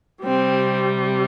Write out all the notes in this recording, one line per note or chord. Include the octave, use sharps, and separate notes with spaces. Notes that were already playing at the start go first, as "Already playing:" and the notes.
C3 G3 C4